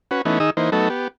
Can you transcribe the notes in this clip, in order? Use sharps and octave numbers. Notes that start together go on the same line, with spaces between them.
C#4 F#4 B4
E3 A3 B3 C#4 D#4
D#3 D#4 G#4 D#6 E6
E3 A#3 D#4 C5
F#3 A3 B3 D#4 A4
B3 G4